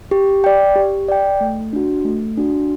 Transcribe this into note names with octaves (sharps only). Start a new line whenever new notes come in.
G4
D5 G5
G4
D5 G5
A3
D4 F#4
A3
D4 F#4